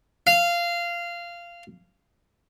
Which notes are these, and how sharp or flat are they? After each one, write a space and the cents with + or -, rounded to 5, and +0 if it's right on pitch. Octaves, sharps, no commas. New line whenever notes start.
F5 -15